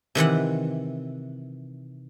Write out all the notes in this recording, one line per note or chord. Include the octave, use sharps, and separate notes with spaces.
C3 D#3 E3 F#5